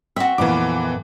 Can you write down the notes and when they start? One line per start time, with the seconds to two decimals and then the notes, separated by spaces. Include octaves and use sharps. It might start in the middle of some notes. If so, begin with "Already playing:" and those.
0.16 C4 F#4 E5
0.38 F2 A#2 E3 B3 D6